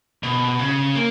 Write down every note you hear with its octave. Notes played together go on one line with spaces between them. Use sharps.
B2
C#3
A#3